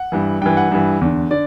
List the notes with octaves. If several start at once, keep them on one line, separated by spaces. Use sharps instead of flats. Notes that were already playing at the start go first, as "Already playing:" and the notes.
Already playing: F#5
G2 E3
G2 E3 G5
F#5
G2 E3
E2 D3
D3 D5